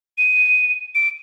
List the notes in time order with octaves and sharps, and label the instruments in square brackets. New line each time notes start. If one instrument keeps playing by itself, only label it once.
[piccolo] D#7
D7